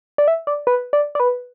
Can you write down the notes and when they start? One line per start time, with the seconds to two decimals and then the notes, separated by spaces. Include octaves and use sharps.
0.18 D5
0.28 E5
0.47 D5
0.67 B4
0.93 D5
1.15 D5
1.20 B4